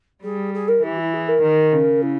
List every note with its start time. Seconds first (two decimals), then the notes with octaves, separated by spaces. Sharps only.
0.23 G3 G#4
0.54 G#4
0.68 A#4
0.83 E3 G4
0.98 E4
1.13 G#4
1.28 A#4
1.43 D#3
1.73 C#3
2.02 E4